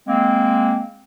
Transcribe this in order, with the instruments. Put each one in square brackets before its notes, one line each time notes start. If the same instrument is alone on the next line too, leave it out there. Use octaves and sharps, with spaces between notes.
[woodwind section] G#3 A#3 C4